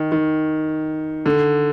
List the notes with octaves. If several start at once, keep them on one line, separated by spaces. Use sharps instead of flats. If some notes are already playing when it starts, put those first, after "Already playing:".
Already playing: D#3
D#3
D3